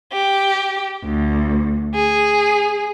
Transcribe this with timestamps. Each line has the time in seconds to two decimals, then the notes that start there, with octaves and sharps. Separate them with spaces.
0.12 G4
1.04 D2
1.93 G#4